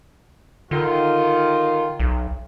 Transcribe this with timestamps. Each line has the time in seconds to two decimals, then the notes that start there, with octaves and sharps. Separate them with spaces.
0.71 D3 D#3 F4
2.00 B1